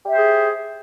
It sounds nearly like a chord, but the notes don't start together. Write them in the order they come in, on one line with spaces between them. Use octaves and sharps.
G4 E5 C5 G#4